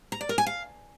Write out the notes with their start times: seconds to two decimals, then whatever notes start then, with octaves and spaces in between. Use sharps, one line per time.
0.12 A#5
0.21 D5
0.29 A#4
0.38 G#5
0.47 F5